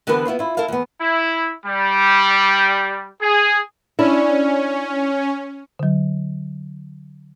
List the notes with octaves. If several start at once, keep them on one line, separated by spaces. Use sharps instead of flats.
D3 E3 B3 G4 A#4 B4
B3 E4 F4 C5
E4 F4
E4 A4 A#4 F5
E2 B3
E4
G3
G#4
C#4 D4 E4
D3 F#3